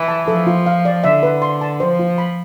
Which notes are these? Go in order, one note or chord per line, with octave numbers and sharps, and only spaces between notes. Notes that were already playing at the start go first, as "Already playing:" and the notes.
Already playing: E3
A5
F3 A4
F4
F5
D5
D3 E5
B4
C6
A5
F3 C5
F4
B5